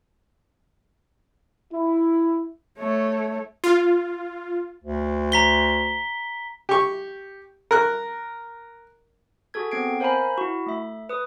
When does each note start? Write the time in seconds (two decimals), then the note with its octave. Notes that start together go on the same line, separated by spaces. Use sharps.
1.72 E4
2.79 A3 C#5
3.64 F4
4.84 D2
5.32 A#5 B6 G7
6.69 G4 C#6
7.71 A#4 F#6
9.54 F#4 G#4 A4 G#6
9.71 B3 C4 G#6 C7 D7
10.00 A#4 C5 F5 G#5 A#5 B5
10.38 E4 F#4
10.66 A3 E5
11.09 B4 D#6